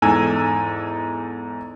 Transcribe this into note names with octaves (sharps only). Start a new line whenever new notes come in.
E2 G#2 A4 G#5 E6